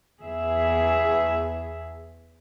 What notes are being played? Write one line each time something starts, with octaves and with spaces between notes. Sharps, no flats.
E2 G#4 E5